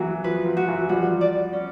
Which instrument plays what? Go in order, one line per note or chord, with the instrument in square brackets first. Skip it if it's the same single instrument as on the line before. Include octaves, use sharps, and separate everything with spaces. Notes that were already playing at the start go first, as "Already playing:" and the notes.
Already playing: [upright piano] E3 F#3 [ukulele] F#4
[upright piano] F3 [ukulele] B4
[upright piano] F3
[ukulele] F#4
[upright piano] E3 F#3
[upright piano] F3 G3 [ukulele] F#4
[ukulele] D5
C#4